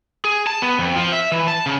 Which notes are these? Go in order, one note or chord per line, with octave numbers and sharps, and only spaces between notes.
G#4
A5
B3
F2
F3
E5
E3
A5
C#3